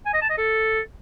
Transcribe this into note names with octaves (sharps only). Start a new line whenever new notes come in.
G#5
D#5
A5
D#5
A4